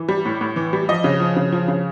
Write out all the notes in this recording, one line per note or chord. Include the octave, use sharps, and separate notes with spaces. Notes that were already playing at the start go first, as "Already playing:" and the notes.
Already playing: E3
G3
A2
A2
E3
G3
F3 D#5
C#3
F3
C#3
F3
C#3